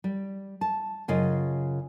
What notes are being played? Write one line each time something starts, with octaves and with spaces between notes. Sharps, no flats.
G3
A5
F#2 C#3 F4 D#5